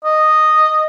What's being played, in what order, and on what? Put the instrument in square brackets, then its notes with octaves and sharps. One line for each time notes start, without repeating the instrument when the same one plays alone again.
[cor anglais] D#5